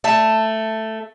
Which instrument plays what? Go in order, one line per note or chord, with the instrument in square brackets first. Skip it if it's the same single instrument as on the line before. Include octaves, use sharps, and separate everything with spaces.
[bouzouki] A3 A5